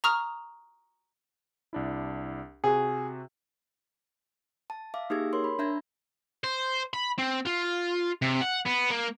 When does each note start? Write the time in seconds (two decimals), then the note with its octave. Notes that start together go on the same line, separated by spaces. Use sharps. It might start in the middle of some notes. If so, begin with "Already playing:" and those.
0.04 A#5 C#6 D#6 F6 F7
1.73 C2 D4 E4
2.64 C3 F#4 G#4
4.70 A5
4.94 E5 F5 D6
5.10 A#3 D#4 G4 G#4 E6 G#6
5.33 A#4 C#5 C6
5.44 B5
5.59 D4 E5 A#5 G6 G#6
6.44 C5
6.94 B5
7.18 C4
7.46 F4
8.22 C3
8.42 F#5
8.66 B3
8.91 A#3